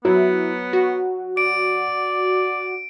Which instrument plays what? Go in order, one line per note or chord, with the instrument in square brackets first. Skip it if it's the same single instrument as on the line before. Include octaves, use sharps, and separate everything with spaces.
[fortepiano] F#3 [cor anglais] B3 [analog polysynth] E4
[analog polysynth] F#4
[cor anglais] D5 [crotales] D7